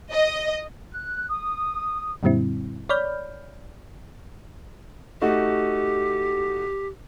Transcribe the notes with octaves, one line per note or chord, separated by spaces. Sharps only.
D#5
F#6
D#6
F#2 A#2 D3 G3 C4 E4
C#5 D5 B5 F6 G6
A3 D#4 F#4 G4